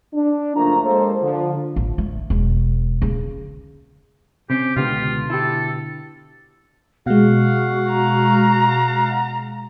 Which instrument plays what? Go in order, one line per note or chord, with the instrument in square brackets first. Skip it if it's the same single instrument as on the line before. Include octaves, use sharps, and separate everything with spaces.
[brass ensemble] D4
F#1 F3 A3 A#3 F4 A#5
G#3 A#3 A4 C5
D3 F3
[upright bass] A1
A3
E1
C#3
[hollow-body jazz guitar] C3 C4 C#4 [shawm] G4
[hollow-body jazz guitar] C#2 G4 [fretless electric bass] B2 D3 B3 [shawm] F4
[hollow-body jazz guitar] E4 G4 [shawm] A4
[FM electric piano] B2 G#3 [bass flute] F#4 [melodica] F5 F#5
[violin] A#5